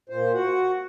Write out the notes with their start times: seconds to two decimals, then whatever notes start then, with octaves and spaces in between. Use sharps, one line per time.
0.09 A#2 C5
0.34 F#4 F#5